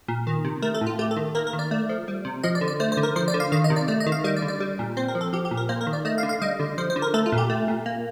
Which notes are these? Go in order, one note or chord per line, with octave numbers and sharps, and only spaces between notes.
A#2
D#3
C3
A3 A#4
A4
A2
F4
A3 G4
A4
D#3
A#3 A#4
A#4
D#3
D5
A3
F3
G3
C3
F3 D#5
D5
D3
D5
A3 C5
C5
D3
A#4
F3 C5
D5
D3
F5
D#3 F5
D#5
C3
D5
A3 D5
D#5
D#3
F5
G3 D#5
D5
D3
D5
G3
A#2
C4 C5
A#4
F3
A4
F3 G4
G4
A#2
A#4
A#3 C5
A#4
D#3
D5
A3 D#5
F5
D3
F5
G3 D#5
D3
F3 C5
C5
D3
A#4
A3 A4
F4
A#2
G4
A3
A#2
A#3